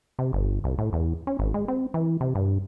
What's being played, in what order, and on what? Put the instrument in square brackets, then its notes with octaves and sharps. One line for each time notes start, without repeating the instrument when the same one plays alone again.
[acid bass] C3
G1
C2
A2
E2
C#4
G#1
G#3
C4
E3
C3
G2